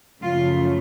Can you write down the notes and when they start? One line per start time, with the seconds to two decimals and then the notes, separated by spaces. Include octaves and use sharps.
0.22 F#2 C#3 F3 A3 F4